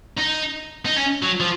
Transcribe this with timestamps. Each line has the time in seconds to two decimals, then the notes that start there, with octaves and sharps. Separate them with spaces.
0.17 D#4
0.85 D#4
0.96 C#4
1.22 F#3
1.40 F3